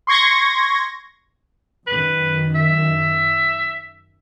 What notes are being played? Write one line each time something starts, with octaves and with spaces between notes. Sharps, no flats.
C6 C#6 G#6 A#6
F#2 D#3 B4
E5